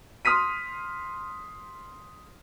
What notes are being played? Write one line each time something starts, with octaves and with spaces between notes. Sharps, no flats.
C6 D#6 F6 B6 D#7